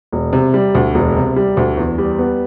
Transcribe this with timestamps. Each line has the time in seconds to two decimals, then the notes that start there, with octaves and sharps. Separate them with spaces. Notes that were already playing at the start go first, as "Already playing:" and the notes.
0.13 E1
0.33 C3
0.54 G3
0.75 D2
0.95 E1
1.16 C3
1.36 G3
1.57 D2
1.77 E2
1.98 G3
2.19 B3